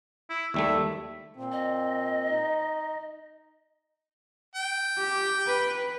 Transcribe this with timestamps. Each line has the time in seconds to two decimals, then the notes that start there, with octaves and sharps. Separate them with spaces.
0.30 E4
0.54 D#2 G3 A3 E5
1.35 A#2 C4
1.52 D#5
2.30 D#4
4.55 G5
4.98 G4
5.47 B4